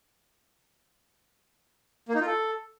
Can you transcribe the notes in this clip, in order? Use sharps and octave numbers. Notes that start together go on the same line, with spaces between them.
A#3
D#4
F4
A4